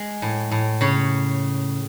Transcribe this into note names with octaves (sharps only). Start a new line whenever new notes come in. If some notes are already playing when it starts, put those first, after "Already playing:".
Already playing: G#3
A2
A2
C#3 C#5